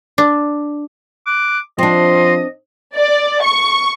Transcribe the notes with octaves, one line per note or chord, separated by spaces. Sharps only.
D4
D6 F#6
F3 C4 D4 D#5 C6
D5
C#6